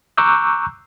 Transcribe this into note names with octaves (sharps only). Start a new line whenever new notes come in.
A#5 C#6 D6 E6 F#6 G6